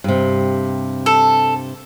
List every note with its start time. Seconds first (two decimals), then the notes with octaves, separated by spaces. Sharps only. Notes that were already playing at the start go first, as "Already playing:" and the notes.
0.04 G2 C3
1.06 A4